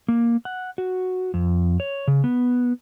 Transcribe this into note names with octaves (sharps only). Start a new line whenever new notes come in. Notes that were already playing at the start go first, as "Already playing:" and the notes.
A#3
F#5
F#4
F2
C#5
C#3
B3